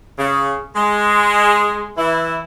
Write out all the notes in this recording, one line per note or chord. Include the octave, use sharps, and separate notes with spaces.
C#3
G#3
E3 E4